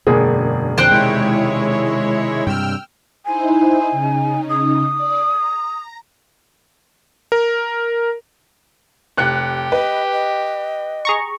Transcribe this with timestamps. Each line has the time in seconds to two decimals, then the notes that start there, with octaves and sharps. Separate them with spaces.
0.07 E1 F#2 D3 A#3 G#4
0.78 F2 D3 E3 C5 G5 F#6
0.91 C3 D#3 G#3 E4 C#5
2.47 G2 C3 G5 E6 F6
3.25 D#4 E4 C5 G#5
3.92 C#3 D#4
4.49 D#6
4.95 D5
5.36 A#5
7.32 A#4
9.17 F1 G4 F#6 C#7
9.72 B4 D#5
10.13 D#5
11.05 G#4 A#5 C#6